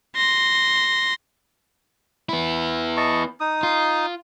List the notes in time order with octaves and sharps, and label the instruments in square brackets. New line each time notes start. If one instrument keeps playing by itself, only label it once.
[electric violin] C6 A#6
[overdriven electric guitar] B3 E4
[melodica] D#5 A5 C#6
D#4 D#6
[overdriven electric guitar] F4